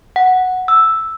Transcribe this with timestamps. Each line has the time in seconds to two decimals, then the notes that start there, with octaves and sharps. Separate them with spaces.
0.16 F#5
0.68 E6